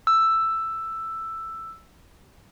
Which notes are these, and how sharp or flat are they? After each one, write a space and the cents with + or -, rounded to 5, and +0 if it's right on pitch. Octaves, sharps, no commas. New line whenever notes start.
E6 +5